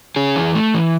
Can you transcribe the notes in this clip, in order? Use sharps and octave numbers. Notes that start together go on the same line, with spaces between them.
C#4 G#4
E3
A3
E3